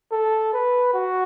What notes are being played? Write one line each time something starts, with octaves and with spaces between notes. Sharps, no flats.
A4
B4
F#4